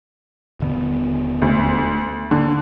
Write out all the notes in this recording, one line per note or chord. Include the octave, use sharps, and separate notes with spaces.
D#1 D3 B3
D2
D3 A#3